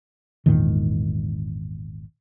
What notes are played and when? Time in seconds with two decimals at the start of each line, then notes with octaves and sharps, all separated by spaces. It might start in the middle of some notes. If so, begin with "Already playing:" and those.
0.46 G#1 E2 A#2 D#3